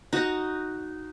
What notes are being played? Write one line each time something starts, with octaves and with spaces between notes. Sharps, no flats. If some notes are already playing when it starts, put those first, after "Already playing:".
D#4 F#4